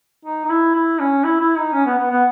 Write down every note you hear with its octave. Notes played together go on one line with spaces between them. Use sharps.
D#4
D#4
E4
E4
C#4
E4
E4
D#4
C#4
B3
B3
B3